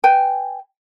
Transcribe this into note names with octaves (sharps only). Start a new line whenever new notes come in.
B4 G5 G#5